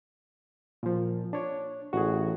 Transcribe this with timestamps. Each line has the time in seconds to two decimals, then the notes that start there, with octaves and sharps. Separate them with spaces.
0.83 A#2 F3
1.33 D4 C#5
1.93 A1 F#4 G#4